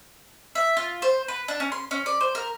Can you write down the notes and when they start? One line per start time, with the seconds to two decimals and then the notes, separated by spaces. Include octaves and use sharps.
0.55 E5
0.77 F4
1.02 C5
1.28 B4
1.48 D4
1.60 C#4
1.72 C6
1.91 C#4
2.06 D5
2.21 C5
2.35 A#4